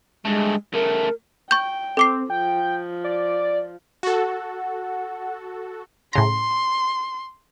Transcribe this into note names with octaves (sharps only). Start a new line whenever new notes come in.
G2 G#3 A3
C#3 A3 A#4
G5 C#6 G6
C4 A4 D6 C7
F3 G5
D5
F#4 A4 F#5
A2 C#3 A#5 C6